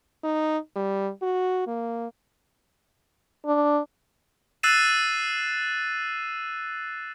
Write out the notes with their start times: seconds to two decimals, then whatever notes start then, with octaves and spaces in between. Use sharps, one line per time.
0.23 D#4
0.76 G3
1.22 F#4
1.67 A#3
3.46 D4
4.63 E6 F#6 A6 C7 D#7 E7